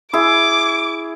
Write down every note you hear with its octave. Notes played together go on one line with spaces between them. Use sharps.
E4 G#4 D6